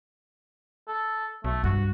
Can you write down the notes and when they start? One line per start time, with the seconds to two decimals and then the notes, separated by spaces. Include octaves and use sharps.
0.88 A4
1.44 B1 A3
1.64 G2 F#4